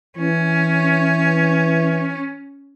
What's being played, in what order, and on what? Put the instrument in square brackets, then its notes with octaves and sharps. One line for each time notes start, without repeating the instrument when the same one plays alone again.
[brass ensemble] E3 [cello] C#4